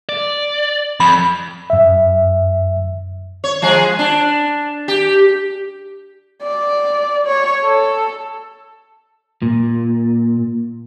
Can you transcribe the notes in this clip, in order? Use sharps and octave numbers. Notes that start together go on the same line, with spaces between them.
D5
F2 B5
F#2 E5
C#5
F3 G#3 G#4
D4
G4
D5
C#5
A4
A#2